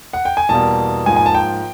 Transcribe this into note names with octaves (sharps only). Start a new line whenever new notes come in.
F#5
G5
G#5
E2 B2 G3 A#3 A5
G#2 F3 A#3 G#5
G#5
A5
G5